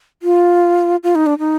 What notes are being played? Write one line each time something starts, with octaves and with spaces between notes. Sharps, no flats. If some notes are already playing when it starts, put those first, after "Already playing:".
F4
F4
D#4
D4
D#4